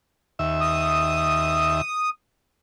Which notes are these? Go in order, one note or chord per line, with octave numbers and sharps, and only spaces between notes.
D#2 E5
D#6